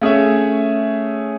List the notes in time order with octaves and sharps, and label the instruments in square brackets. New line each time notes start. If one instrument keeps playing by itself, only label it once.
[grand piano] A3 C#4 G#4 C#5 E5